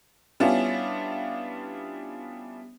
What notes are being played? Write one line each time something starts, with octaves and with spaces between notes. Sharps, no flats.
G3 B3 C#4 D4 E4 F4